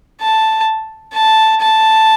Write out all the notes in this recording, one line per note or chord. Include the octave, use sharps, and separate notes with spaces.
A5
A5
A5